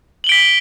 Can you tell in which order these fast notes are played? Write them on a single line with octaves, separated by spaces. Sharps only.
F#7 G7 D7 B6